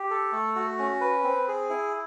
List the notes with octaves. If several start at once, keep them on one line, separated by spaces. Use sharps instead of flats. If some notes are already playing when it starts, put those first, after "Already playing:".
Already playing: G4
A4
A3
F#4
C#4
B4
C4
G#4
E4